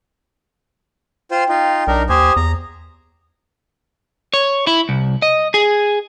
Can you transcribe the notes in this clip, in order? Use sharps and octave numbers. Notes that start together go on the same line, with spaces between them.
F4 C5 G5
D#4 F4
B1 D4 D#4 A#4
D#2 G4 C5 G#5 D#6
E2 A#5
C#5
E4
C2
D#5
G#4